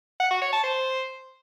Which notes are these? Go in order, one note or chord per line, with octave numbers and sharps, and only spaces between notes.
F#5
F#4
C#5
A5
C5